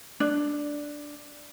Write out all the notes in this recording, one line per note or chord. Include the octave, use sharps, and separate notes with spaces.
D4